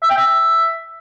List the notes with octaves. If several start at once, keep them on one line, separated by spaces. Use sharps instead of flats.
E5
G5
E5